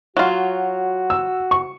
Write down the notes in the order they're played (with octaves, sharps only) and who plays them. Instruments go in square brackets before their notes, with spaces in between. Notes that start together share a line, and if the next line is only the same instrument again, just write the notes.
[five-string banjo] F#3 F4 [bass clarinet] F#4
[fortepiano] E6
C#6